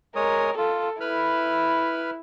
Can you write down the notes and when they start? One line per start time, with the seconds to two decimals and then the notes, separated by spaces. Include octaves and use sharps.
0.16 G#3 A#4 C#5 D#6
0.58 F4 A4
1.01 E4 B4 B5 F6